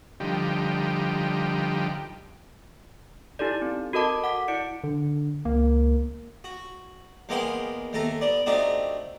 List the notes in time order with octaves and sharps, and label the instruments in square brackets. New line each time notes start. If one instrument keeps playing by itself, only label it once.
[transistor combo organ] D3 F3 G3 D#4 G4
[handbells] D#4 E4 G4 A4 D5
C4
F#4 A4 A#4 D#5 A5 D6
F#5 D6 B6
E4 D5 C#7 D7
[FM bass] D3
[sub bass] C#2 [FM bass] A#3
[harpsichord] F#4
E2 G#3 A#3 B3 G5 C6
D#2 A3 A4 A#5
B3 D5
A3 C4 D4 D#4 F#4 G4